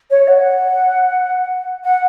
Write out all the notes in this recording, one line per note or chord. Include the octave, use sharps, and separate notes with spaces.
C#5
F#5
F#5